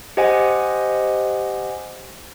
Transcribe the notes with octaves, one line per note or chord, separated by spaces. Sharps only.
G4 C5 D#5 F#5 G#5